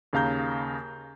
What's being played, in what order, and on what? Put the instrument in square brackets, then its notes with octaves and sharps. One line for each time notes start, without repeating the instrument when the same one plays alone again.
[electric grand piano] D#2 C#3 F5 A#5 G6